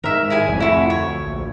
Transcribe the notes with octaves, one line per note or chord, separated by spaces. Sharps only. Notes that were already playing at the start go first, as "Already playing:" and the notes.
G#2 D#3 A#4 E5
E4 G#4 G#5
F1 F2
A3 E4 F#4
D2 C#5
A#1